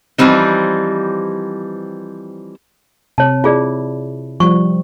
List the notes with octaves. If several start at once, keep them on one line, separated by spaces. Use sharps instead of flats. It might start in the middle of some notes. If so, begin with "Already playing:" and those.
E3 F3 G3 C4 D#4
C3 C#5 A5
E4 F4 G#4 D5
F3 G3 C#6